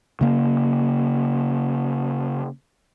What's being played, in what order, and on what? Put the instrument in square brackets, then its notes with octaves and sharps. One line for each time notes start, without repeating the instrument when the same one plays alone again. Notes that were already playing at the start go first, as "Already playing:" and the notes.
[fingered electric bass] C#3 A#3